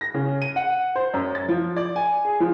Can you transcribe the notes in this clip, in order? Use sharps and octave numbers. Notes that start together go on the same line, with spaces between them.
A#6
C#3
D#7
F#5
C5
F#2
A6
F3
D5
G#5
G#4
F3